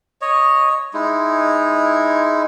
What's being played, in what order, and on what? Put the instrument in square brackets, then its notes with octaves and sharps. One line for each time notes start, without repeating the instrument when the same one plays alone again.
[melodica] C#5 D#5
G#3 D#4 E4